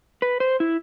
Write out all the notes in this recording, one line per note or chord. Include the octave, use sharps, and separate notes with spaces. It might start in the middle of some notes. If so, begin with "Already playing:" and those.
B4
C5
E4